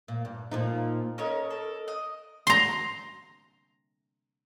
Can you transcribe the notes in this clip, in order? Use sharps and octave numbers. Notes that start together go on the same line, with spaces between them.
A#2
G2
A#2 F3 D#4
C#4 A4 A#4 C#5 D#5
A4
D#5
A#5 C6